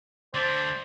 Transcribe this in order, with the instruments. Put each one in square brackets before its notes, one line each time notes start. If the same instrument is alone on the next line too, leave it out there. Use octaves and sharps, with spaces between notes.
[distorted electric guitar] D2 A3 [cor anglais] C5 [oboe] D5